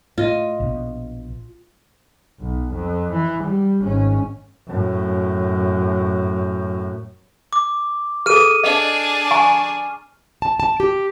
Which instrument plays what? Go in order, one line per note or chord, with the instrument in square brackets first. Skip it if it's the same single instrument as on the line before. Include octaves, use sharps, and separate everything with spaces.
[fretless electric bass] A2 [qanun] F4 D#5
[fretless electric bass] A#1 B2
[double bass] B1
F2
E3
G3
G#1 C#4
F#2 A2
[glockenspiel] D6
[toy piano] G#4 A4 [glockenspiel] F6 D#7
[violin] D4 G#4 [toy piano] D#5
[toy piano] G#5 A#5 C#6
[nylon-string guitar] A5
A5
G4